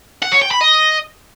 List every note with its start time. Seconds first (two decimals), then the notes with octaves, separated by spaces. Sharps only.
0.22 F#5
0.32 C#5
0.42 G5
0.51 B5
0.61 D#5